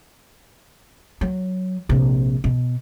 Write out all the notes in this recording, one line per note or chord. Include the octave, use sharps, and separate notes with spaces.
F#3
A#1 C3
B2